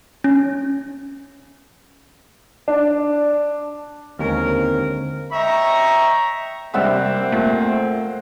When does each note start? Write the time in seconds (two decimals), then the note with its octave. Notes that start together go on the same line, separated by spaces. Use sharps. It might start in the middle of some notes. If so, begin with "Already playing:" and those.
0.24 C#4
2.68 D4
4.19 D#2 D3 G#3 C4 C#4 A#4
5.32 C#5 D#5 E5 G5 A#5 C#6
6.74 C3 G3 A#3 C4 C5 E5 F#5 E6
7.32 A#2 A3